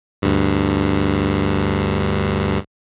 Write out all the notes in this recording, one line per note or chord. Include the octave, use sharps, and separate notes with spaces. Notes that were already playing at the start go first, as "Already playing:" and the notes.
D2 G2